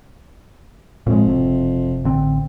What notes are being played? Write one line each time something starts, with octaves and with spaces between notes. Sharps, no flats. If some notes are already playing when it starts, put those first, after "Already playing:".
F2 A2 G#3
F#1 C3
A1 D3 C4